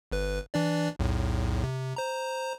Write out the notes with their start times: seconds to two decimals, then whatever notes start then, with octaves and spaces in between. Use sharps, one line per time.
0.12 G1 B4
0.54 E3 D4 D5
0.99 B1 E2 A2
1.64 C3
1.96 C5 A#5